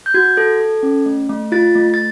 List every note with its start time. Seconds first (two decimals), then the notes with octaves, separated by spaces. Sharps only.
0.06 G6
0.14 F#4 G#6
0.37 A4
0.60 A4
0.83 C#4
1.06 A3
1.29 A3
1.52 F4 A6
1.75 A3
1.94 A6